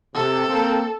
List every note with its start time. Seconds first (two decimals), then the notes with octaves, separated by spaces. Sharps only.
0.15 C3 A4
0.48 A#3 C4